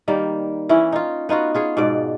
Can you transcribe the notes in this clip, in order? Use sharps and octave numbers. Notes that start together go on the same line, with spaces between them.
D#3 G3 A#3
E3 C#4 E4
D#4 F4
B3 D#4 F4 F#4
F4 G#4 C#5
G#2 B2 D5